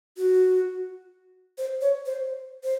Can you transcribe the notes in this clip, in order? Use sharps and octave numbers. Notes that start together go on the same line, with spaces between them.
F#4
C5
C#5
C5
C5